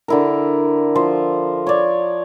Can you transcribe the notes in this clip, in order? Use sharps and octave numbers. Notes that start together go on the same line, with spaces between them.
D3 E4 A#4
F3 C5
C#5 D5